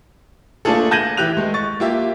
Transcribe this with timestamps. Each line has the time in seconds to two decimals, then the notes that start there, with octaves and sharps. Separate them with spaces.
0.65 A3 A#3 D4 F4 G#4 A4
0.91 A5 G6 G#6 A#6 D#7 F#7
1.17 E3 E4 G4 F#6 F7
1.37 G#3 A3
1.54 C#6 A6
1.80 A#3 F4 G4 E5